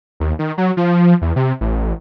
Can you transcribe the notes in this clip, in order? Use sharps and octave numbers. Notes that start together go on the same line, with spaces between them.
D#2
D#3
F#3
F3
E2
C3
A1